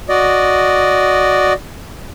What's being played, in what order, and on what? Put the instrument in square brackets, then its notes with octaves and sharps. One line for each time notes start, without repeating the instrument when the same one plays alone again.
[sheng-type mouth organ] F#4 D5 D#5